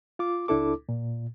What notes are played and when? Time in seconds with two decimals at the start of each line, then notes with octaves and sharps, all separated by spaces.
0.19 F4 D6
0.48 C#2 D4 E4 A4 D6
0.89 A#2